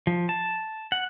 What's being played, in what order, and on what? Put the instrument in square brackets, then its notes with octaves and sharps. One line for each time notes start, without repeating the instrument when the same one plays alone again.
[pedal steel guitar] F3
A5
F#5